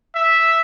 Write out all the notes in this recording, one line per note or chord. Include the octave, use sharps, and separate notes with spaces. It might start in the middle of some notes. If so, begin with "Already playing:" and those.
E5